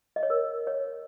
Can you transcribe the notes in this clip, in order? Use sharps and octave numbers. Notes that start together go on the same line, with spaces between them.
D#5
C#5
A#4
C#5